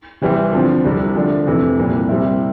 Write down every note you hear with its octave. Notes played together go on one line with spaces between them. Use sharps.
C3 E3 G3 C4 E4
D3 F3 C4
C2 C3 G3
D3 F3 A3 D4
F2 C3 E3 A3
C2 A#2 G3
C3 G3 C4 E4